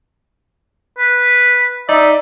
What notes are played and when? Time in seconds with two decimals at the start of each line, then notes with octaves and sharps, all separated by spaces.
0.98 B4
1.89 D#4 D5 E5